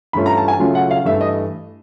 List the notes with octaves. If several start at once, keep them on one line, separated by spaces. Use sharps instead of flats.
G2 E3 A3 C#4 F4 B5
A#5
A5
G#5
C#3 F#3 A3 C#4 F4
F#5
F5
G2 E3 A3 E5
D#5